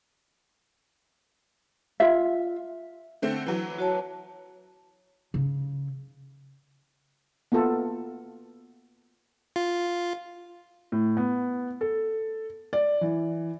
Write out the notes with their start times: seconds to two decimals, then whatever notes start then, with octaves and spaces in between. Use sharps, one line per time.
2.00 F4 E5
3.22 D3 A3 C4
3.46 E3 F#3
3.78 F#4 C#5 A5
5.34 C#3
7.52 A#3 B3 F4 A4
9.56 F4
10.92 A2
11.17 B3
11.81 A4
12.73 D5
13.01 E3